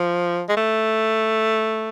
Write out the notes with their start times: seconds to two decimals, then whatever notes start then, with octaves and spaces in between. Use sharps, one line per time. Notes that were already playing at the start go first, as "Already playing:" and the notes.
Already playing: F3
0.49 G#3
0.57 A3